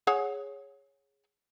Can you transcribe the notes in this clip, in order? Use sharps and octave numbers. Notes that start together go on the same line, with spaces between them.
G#4 C#5 F#5